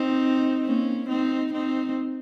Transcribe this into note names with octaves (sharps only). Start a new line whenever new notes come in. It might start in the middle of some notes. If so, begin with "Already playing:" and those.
Already playing: C4 D#4
A#3 C#4
C4 D#4
C4 D#4